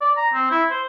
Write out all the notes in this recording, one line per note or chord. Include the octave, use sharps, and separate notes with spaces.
D5
A#5
C4
E4
C5